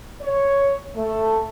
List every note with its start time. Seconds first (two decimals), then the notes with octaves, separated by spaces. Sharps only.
0.21 C#5
0.95 A3